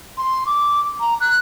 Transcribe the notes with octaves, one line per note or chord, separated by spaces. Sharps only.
C6
D6
A#5
F#6